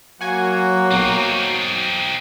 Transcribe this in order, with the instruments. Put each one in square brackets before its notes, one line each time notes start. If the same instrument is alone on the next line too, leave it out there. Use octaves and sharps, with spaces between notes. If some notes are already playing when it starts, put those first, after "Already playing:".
[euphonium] F#3 [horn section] A#3 F#4 [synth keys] F#5 G#5
[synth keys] B1 B2 [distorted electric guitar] C4 D#4